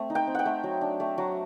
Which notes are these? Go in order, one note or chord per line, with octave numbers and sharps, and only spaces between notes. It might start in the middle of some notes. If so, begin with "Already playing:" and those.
Already playing: A3 C4
D#4
G5
C4
F#5 G5
A3
F#3
D4
A3
F#3